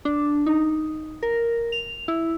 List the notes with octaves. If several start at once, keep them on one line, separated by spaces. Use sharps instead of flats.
D4
D#4
A#4
F7
E4